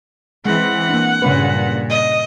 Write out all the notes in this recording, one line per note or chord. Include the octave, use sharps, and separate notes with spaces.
E3 G#3 C4 F#5
A#3 D4
G2 A#2 C#3 C#4 B4
D#5